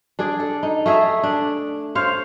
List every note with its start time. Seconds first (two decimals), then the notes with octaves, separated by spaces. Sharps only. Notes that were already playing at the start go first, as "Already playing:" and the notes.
0.19 D4 G#4 D5
0.40 A4
0.63 D#4
0.86 A3 G#4 E5
1.23 D4
1.95 C5 C#5 F5